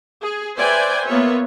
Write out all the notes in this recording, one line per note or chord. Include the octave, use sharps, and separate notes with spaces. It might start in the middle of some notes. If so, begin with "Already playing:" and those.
G#4
B4 C5 D5 E5 G5 G#5
A#3 B3 F4 C#5 E5